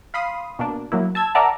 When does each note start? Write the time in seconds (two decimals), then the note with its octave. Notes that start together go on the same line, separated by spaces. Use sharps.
0.14 F5 B5 C6 D#6
0.59 B2 A#3 D4
0.92 F#3 A#3 E4
1.15 A5 E6 G#6
1.35 A#4 D5 E5 F#5 A5 A#5